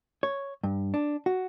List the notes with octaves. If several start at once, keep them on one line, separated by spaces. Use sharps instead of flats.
C#5
G2
D4
F#4